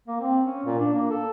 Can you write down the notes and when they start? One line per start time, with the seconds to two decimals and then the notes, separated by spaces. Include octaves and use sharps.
0.08 A#3
0.20 C4
0.45 C#4
0.65 A#2
0.79 D4
0.93 A#3
1.10 A4